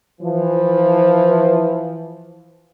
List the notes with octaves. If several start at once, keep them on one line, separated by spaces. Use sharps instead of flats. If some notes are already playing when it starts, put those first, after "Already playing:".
E3 F3